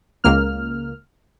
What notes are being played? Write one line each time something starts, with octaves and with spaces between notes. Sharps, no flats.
C#2 A#3 F6